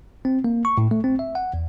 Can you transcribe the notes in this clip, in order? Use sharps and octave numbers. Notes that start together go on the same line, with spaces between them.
C4
A#3
C#6
A2
A3
C4
E5
F#5
E2